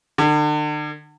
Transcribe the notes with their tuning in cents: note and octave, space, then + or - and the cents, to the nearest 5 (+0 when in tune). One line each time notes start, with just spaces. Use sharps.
D3 +40